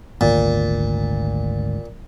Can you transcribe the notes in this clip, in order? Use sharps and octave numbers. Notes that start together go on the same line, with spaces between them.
G#1 D2 A#2